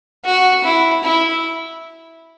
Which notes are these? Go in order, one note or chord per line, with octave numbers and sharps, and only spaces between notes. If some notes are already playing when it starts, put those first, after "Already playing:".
F#4
E4
E4